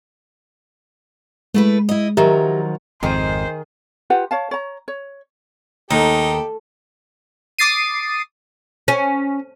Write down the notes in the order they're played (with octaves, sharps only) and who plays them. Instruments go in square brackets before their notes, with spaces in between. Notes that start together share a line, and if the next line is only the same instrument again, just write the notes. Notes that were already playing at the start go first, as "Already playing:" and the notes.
[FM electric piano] G#3 [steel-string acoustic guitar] A3 E4 B4
[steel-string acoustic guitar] E4 D#5
[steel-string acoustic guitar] D#3 F3 F#3 [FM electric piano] G4 E5 A#5
[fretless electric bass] G#1 [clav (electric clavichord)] F2 [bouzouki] D#3 G#4 A#5 [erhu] C5
[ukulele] F4 G4 B4 F#5
C#5 F5 A5
C#5 A#5
C#5
[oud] D#2 [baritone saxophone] D#4 [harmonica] G4 [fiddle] A4
[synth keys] D6 D#6 A6 C7 D#7
[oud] C#4